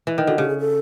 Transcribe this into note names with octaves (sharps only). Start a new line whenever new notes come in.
E3
D#3
D3 F#4
C#3 G4
G#4
A4